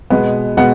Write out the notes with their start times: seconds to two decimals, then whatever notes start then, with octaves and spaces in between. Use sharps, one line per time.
0.10 B2 G#3 B3
0.57 B2 G#3 B3 F#5